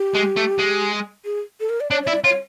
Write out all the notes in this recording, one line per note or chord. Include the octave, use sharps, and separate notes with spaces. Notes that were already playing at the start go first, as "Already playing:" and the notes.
Already playing: G4
G#3
A3
G#3
G#4
A4
A#4
D5
D4 C#5
C#5
E4 D5
F4 C#5